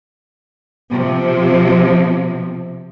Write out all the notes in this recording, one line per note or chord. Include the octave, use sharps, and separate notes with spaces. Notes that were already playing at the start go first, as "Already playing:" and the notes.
C3 F3